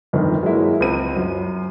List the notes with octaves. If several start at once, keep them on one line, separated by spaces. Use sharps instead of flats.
G1 F2 D#3
F#3 G#3 A#3 E4
C#2 C4 D#7
F#2